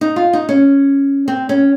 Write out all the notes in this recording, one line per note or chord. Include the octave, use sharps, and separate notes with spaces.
D#4
F4
D#4
C#4
C4
C#4